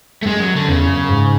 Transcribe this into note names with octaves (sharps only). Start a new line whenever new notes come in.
A3
F#2 G#3
F#3
D3
E2 C#3
F#2
G#2